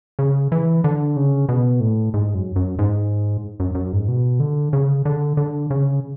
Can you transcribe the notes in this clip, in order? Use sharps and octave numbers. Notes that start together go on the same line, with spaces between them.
C#3
E3
D3
C#3
B2
A2
G#2
F#2
F#2
G#2
F#2
F#2
G#2
B2
D3
C#3
D3
D3
C#3